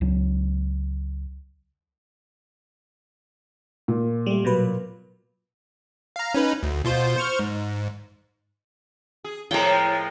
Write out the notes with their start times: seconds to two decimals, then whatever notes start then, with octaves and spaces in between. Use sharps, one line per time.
0.01 C#2 F#3
3.88 A#2
4.26 G3 A3
4.45 B2 F#3 B4
6.16 F5 A#5
6.34 C#4 D#4 B4
6.63 D2
6.85 B2 F4 C5
7.16 C5 C#6 F6
7.39 G#2
9.24 G#4
9.51 A2 F3 G#3 A#4 G5